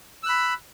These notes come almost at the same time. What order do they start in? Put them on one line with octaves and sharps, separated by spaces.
E6 F#6 B5